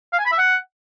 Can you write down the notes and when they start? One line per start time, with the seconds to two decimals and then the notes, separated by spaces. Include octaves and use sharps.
0.13 F5
0.19 G#5
0.25 B5
0.32 E5
0.38 F#5